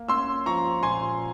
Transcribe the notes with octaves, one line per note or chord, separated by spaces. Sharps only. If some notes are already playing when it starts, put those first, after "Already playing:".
Already playing: A#3
C#4 C6 E6
F3 A#5 C#6
A#2 G#5 C6